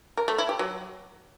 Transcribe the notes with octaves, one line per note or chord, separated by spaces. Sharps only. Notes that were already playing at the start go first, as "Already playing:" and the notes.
A#4
A3
E4
G4
F#3